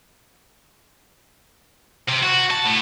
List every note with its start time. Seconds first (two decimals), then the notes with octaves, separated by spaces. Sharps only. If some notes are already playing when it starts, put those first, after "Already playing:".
2.09 C3
2.23 F#4
2.51 A5
2.65 A2